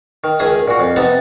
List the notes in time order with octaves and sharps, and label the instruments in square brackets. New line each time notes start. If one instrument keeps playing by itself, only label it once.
[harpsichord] D#3
C#2 D#3 G#4 E5 D#6
A#2 F#4
F2
C3 B3 D#4 E5 A5